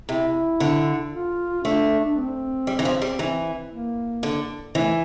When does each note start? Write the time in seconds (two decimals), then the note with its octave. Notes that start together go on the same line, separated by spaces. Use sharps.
0.09 C3 E4
0.60 D3
1.13 F4
1.64 A3 D4
2.04 D4
2.16 C4
2.67 G3
2.79 E3
2.85 F3
3.02 G3
3.19 E3
3.71 A#3
4.23 D3
4.75 E3 A3